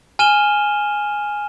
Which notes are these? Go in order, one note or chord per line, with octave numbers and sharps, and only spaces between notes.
G#5 F6 D#7 E7 G7